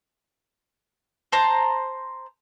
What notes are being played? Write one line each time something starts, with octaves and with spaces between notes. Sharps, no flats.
C5 A5 A#5